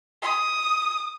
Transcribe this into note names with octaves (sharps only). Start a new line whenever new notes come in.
D#6